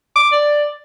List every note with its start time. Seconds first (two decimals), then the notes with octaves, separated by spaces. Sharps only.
0.16 D6
0.32 D5